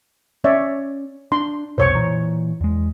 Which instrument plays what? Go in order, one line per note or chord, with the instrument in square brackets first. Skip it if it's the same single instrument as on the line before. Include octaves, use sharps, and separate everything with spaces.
[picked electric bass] C#4 [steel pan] C#5 D5 E5
[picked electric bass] D4 [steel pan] C6
[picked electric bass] C2 F2 B2 [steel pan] C5 C#5 C#6
[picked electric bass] A#2 E3 [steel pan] A#5
[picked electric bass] E2 G#3